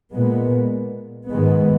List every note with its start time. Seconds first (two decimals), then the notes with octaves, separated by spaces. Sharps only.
0.11 A#2 G#3 B3
1.29 G#2 D#3 G#3 B3